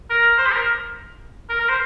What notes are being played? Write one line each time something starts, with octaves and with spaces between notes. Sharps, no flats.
A#4
C5
G4
A#4
A#4
A#4
C5